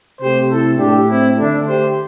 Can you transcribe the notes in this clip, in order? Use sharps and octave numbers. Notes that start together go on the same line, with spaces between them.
C3 A3 G4 C5
E4 A4
A2 A3 D4 G4
C4 E4
D3 A3 D4
G4 C5